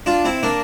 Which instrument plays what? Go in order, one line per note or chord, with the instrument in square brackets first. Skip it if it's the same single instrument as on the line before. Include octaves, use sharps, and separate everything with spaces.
[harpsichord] D4 F4
C4 E4
A#3 D4